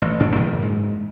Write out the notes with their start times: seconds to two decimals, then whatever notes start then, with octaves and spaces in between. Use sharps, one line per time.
0.02 A1
0.20 A1 D2 G#2 D4
0.35 F#2 A#2 C#3 E3
0.62 G#2